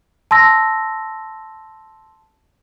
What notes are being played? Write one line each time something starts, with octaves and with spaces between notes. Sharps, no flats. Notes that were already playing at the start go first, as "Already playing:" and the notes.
A5 C6 E6 A#6